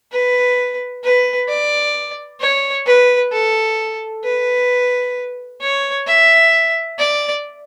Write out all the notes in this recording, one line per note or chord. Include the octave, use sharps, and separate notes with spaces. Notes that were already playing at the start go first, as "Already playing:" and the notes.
B4
B4
D5
C#5
B4
A4
B4
C#5
E5
D5